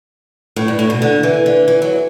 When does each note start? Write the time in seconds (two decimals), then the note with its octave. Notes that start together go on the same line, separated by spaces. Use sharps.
0.56 A2
0.68 G2
0.79 A2
0.90 B2
1.02 D3
1.23 E3
1.46 D3
1.68 E3
1.82 F#3